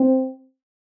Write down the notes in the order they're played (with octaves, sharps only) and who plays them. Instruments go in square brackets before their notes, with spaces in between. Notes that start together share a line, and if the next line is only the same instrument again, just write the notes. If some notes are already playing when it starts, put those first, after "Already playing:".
Already playing: [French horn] C4